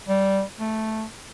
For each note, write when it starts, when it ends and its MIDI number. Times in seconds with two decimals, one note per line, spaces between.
0.08 0.42 55
0.60 1.04 57